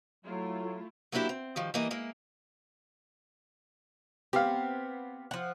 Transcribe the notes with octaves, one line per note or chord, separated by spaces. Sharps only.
F#3 A3 E4 F4
F#3 A#3 C4 D4 E4 G4
C4
D#3 F3 G3
E3 G3 A#3 D#5
G#3 A#3 E4 A#4
B3 C4 G4 F5
F3 F#5